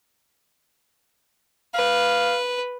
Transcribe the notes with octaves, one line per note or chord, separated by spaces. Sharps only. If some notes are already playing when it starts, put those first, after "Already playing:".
B4 F5